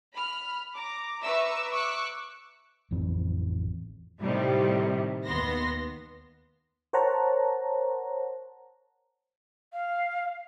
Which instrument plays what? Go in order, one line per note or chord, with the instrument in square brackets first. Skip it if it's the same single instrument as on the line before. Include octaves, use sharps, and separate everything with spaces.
[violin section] B5 F6
A#5 D6
B4 E5 A#5 C#6 D6 E6
C#6 D6 E6 F#6
[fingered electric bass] A1 F2 E3 C4
[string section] A2 C3 D#3 G3
D#2 B3 C6 A#6
[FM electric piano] A#4 C5 C#5 F#5 A5 A#5
[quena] F5